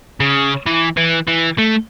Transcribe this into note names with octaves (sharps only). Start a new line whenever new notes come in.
C#3
E3
E3
E3
A3